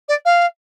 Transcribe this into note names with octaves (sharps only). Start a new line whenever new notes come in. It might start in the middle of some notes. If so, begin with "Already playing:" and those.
D5
F5